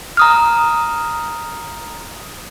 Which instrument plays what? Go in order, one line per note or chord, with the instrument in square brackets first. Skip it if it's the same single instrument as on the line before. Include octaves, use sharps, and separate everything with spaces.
[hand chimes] A#5 D#6 F6